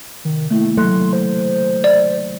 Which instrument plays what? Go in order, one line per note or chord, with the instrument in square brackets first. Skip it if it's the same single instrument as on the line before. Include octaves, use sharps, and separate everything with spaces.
[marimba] C3 [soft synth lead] D#3
[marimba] D#3 A#3 E4 [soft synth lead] A3
[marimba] C#3 F#3 F#6 [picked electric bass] A3 [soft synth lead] C6
[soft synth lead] C5
[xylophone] D5